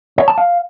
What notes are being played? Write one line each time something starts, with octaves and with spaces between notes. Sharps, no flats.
C#5
A5
F5